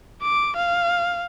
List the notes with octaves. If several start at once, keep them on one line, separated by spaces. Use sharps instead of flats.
D6
F5